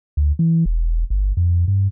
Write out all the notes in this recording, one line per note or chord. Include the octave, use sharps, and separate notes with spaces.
D2
E3
E1
G1
F2
G2